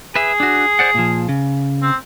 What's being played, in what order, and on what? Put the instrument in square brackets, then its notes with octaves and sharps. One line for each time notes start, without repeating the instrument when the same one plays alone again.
[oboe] G#4 [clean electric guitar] B4 E5
[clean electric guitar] D4 F#4
C5 D5 F#5
A#2 F3
C#3
[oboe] C4